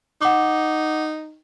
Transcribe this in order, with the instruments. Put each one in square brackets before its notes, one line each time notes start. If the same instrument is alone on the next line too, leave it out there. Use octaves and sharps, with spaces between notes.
[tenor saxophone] D#4 [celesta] F#5 D6